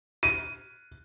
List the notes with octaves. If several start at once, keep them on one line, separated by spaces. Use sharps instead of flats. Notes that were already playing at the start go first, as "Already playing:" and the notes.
D#7